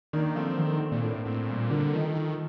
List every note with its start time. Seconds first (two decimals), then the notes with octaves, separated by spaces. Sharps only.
0.13 D#3 A#3 D4
0.36 F3 A3 C4
0.58 D#3 A3 C4
0.80 A3 C4
0.92 A#2
1.03 A2 A#3 D4
1.25 A2 A3 C4
1.47 A#2 G3 A#3
1.70 D3 G3 A#3
1.93 D#3 F3 A3
2.15 F3 A3